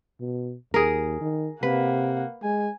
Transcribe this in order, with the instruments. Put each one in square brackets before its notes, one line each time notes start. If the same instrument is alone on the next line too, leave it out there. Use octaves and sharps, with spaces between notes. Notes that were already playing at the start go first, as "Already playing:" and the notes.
[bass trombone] B2
[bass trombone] D#2 [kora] G#4 A#4
[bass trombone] D#3
[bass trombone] C3 [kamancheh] A#3 F#5 [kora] B4
[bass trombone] G#3 [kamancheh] G#5